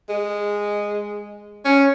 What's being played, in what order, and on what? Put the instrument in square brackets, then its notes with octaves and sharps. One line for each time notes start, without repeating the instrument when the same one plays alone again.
[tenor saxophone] G#3
C#4